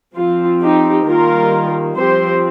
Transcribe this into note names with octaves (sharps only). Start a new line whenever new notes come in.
F3 C4 F4
D#4 G4
D#3 G3 A#3 F4 A#4
F3 C4 G4 C5